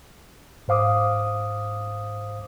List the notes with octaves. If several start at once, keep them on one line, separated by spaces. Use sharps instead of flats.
G#2 C5 F5 D6 D#6